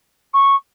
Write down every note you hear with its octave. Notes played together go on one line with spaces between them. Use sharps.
C#6